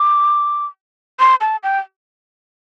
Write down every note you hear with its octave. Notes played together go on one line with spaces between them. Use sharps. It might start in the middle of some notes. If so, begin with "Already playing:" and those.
Already playing: D6
C6
A5
G5